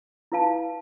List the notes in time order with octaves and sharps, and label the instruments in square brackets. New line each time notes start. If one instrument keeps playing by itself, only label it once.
[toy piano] E4 B4 F5 A5